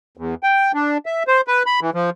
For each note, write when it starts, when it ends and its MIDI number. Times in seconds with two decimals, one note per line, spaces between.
0.17 0.35 40
0.43 0.72 79
0.74 0.98 62
1.06 1.23 76
1.28 1.41 72
1.48 1.63 71
1.66 1.80 83
1.81 1.90 52
1.94 2.10 53